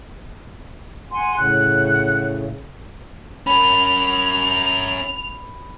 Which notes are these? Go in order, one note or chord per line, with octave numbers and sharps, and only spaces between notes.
F#5 G#5 C6
A2 C#3 F#5 F#6
C#4 A#4 B5 F7